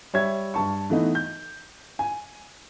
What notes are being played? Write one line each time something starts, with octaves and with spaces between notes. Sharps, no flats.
G3 C#5 E5 G#6
G2 A5 C#6
E3 A3 B3 D#4
G6
G#5